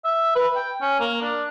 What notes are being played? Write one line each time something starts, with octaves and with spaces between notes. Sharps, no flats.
E5
B4
G5
C#4
A#3
D4